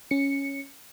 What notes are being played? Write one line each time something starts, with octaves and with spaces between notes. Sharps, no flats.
C#4 C#7